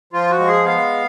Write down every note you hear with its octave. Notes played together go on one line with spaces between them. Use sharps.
F3 F4
F#4
G#3
G#4
B3 F5